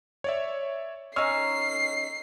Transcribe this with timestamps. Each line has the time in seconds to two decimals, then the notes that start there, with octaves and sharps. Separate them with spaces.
0.24 C#5 D5 E5
1.16 C#4 D#4 E6 F6 C7